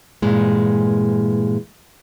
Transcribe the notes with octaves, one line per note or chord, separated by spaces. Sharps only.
G2 A#2 E3 G#3